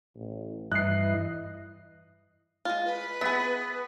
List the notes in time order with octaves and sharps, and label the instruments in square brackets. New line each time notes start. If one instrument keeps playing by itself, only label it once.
[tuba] A1
[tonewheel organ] G2 E4 D#5 [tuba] E3 [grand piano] F#6 C7
[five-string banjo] G#3 F4
[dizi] B4
[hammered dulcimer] B3 [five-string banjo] G#4 E5